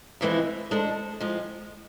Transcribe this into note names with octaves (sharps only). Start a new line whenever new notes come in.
F2 E3 G#3 C4 E4
G#3 D4 A4 C5
F3 G#3 C4